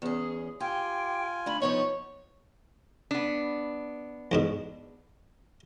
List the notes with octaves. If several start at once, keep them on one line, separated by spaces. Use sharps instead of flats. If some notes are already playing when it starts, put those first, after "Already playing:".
E2 C#4 G#4
F4 G4 G5 G#5
D3 A3 D4 B5
F3 B3 D#4 C#5 C#6
B3 D4
E2 G#2 B2